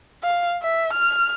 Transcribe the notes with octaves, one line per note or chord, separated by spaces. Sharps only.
F5
E5
F6